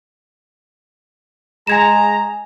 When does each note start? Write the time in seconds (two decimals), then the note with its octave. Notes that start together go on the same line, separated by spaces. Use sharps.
1.67 G#3 G#5 A#5 G#6 E7